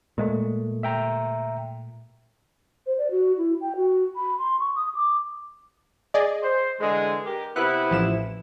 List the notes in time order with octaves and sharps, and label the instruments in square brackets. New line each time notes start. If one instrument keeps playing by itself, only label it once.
[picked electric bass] A#2 G#3 A3
[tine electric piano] E5 G5 A#5
[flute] C5
D5
F#4
E4
G5
F#4
B5
C6
C#6
D#6
D6
[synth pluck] G#4 D5 D#5
[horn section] C5
D3 E3 G#3
G4 A#4
[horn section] C3 B3 E4 [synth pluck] F#6
[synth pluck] A1 F3 E7